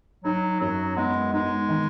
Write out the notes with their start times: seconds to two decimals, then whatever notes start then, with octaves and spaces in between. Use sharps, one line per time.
0.25 F#3 D#4
0.61 F#2 F#3
0.97 G#3 B3
1.33 G#3 D#4
1.69 D#3